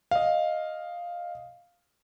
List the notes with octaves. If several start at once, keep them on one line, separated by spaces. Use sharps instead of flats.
D#5 F5